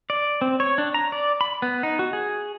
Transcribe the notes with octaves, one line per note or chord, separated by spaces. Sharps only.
D5
C4
C#5
D4
A#5
D5
B5
B3
D#4
F#4
G#4